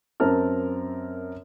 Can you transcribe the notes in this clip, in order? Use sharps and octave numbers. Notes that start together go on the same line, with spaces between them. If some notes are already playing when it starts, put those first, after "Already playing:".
F#2 C4 A#4 A5 F6